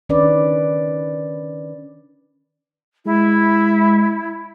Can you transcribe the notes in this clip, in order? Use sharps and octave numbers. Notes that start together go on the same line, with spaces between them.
D#3 C#4 D4 B4 D5
G#3 E4